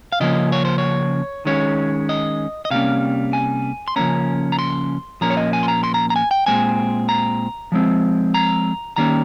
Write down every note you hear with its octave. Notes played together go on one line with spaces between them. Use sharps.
F5
C#3 F3 A#3 C#4 D#5
C#5
C5
C#5
D#3 G#3 C#4 C#5
D#5
D#5
C3 G3 A#3 C#4 F5
G#5
C6
C#3 F3 A#3 C#4 A#5
A#5
C6
A#2 F3 A#3 C#4 A#5
C#5
D#5
G#5
C6
A#5
C6
A#5
A#5
G#5
G5
A#2 F3 G#3 C4 G#5
A#5
F3 G#3 C4
A#5
D#3 G3 A#3 C#4 A#5